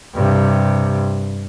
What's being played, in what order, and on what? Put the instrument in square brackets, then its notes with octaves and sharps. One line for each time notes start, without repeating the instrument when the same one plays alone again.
[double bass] G2 C3